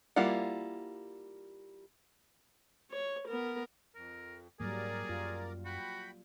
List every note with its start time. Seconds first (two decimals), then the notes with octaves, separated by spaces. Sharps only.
0.16 G3 A#3 E4 F4 F#5
2.91 C#5
3.28 B3 A#4
3.95 F2 A#4
4.60 G#2 F#3 G3 A#3 G#4 A#4 D5
5.09 F#2 F4
5.65 F#4 G5 B5